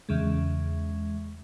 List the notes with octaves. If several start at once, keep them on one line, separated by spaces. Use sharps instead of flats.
E2 C#3 G#3